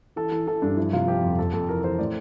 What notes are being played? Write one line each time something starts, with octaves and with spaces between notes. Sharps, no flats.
E3 A4
E3
E3 A4
G2 D4
F3 E4
C3 F4
F3 G4
F2
F2 A4
F2 A4
E3 A#4
E3 C5
A2 D5